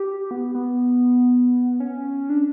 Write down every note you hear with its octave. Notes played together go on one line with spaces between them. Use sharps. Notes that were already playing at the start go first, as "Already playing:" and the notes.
Already playing: G4
B3
B3
C#4
D4